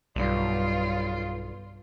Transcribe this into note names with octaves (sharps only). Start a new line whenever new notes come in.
B1 G2 F4